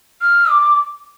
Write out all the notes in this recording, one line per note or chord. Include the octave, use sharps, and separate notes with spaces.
F6
D6